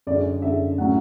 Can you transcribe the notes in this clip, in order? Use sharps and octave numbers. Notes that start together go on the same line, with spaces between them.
F#2 D3 G#3 C#4 D5
F#2 D3 G#3 C#4 E5
A2 F#3 C#4 F#5